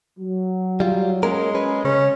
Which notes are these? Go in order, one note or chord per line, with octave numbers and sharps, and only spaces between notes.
F#3
G3 F4
G#3 A#3 C#4 A#4
C#4 G#4 B4
C#3 C#4